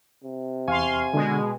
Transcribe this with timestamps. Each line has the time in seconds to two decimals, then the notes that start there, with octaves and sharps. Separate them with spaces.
0.24 C3
0.68 E2 F5 G#5 C6 C#6
1.14 B2 D3 G#3